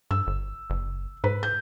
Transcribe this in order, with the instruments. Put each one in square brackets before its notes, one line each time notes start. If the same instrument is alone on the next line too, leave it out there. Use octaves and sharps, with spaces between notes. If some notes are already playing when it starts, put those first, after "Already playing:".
[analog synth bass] G2 [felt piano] E6
[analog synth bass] G1
F#1
[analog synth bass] G#2 [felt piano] B4
[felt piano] G6